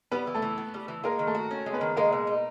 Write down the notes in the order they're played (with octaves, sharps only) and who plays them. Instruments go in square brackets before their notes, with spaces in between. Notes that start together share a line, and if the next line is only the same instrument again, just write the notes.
[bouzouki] G3 [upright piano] B3 B4
[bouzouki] E3
[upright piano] A3 A4
[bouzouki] E3
B3
G3
E3
[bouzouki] G#3 [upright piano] A#3 A#4
[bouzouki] D#3
[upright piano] A3 A4
[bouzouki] F#4
C#4
G#3
[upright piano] B3 B4
[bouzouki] D#3
[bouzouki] G#3 [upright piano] A#3 A#4
[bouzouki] B2
D#4